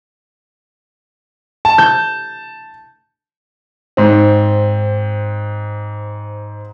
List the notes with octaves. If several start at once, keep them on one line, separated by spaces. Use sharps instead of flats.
A5
G6
G#2 C4